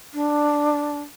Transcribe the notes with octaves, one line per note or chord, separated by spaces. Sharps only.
D4